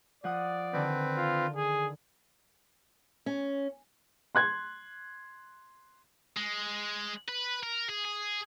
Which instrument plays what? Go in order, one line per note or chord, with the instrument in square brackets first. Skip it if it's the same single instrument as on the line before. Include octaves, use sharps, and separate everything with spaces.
[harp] F3 F#5 D#6 [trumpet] D5
[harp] D3 D#3 [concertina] C4 B4
[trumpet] F4
G#4
[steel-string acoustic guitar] C#4
[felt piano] C6 F#6 G#6
[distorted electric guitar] G#3
B4
A#4
G#4
G#4